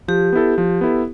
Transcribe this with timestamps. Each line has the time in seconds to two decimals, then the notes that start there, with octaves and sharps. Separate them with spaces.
0.08 F3 G4
0.33 B3 E4 A4
0.58 F3
0.81 B3 E4 A4